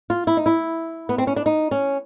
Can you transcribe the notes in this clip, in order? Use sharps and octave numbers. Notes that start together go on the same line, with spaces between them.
F4
E4
D#4
E4
B3
C4
C#4
D4
D#4
C#4